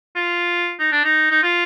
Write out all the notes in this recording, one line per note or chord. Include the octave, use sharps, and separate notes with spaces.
F4
D#4
D4
D#4
D#4
F4